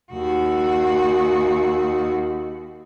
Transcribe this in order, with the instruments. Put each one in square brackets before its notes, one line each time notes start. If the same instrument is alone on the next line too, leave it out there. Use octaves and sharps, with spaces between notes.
[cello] D#2 F#4